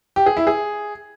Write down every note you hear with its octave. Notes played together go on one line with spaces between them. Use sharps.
G4
G#4
E4
G#4